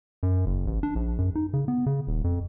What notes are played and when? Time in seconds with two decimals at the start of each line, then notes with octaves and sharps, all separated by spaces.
0.23 F#2
0.46 F#1
0.67 A1
0.83 D4
0.95 A#1
1.18 F#2
1.35 D#4
1.53 C#3
1.68 B3
1.86 C#3
2.07 D#1
2.24 F2